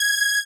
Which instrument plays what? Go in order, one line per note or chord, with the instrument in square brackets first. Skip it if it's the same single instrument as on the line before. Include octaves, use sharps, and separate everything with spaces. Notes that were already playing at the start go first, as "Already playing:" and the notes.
Already playing: [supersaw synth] G#6